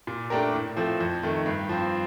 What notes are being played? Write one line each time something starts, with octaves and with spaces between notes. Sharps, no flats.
A#2
A3 D4 G4 A#4
A2
F3 A3 C4
F2
D#3 A3
G2
F3 C4